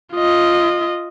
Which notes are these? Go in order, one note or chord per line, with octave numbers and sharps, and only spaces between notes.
F4 D#5